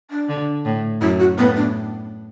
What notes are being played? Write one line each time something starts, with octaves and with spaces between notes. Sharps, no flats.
D4
D3
A2
F#2 E4
F#4
A2 B3
D4